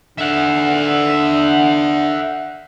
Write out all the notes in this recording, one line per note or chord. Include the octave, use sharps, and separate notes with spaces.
D3 E5 F#5